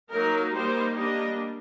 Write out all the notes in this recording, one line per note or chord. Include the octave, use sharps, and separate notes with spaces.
F#3 A#3 D#4 A#4
G3 A#3 D#4 C5
G3 A#3 D4 D#5